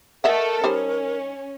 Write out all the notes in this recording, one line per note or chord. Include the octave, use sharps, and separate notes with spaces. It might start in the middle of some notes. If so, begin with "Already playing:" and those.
A3 A4 A#4 D#5 E5 F#5
G3 C#4 D#4 C5